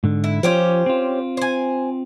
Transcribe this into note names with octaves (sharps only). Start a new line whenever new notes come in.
G#2 D3
E4
F3 C#4 F4 G4 C5
C4 F4
C5 G#5